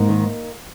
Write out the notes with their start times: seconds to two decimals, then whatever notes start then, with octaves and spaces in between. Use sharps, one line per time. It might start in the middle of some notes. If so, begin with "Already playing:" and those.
Already playing: G#2 A#3 D#4
0.09 D#3